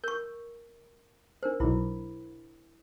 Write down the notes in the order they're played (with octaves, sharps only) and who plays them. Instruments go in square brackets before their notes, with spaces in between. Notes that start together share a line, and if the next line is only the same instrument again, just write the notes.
[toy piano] A#4 C#6 [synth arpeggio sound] G6
[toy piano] D4 A#4 C5
[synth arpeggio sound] B1 B2 [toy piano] E4 B5 D6